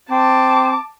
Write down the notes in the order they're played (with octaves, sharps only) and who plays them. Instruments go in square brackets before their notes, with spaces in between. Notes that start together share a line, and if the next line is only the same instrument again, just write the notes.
[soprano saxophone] C4 [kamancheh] A5 D6